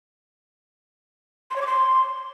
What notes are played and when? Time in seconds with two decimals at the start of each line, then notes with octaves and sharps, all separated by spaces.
1.50 C6
1.56 C#5
1.61 D6
1.67 C6